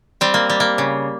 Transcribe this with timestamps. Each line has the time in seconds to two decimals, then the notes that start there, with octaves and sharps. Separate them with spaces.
0.21 G3 C4
0.34 A#3
0.50 G3
0.60 A#3
0.78 C#3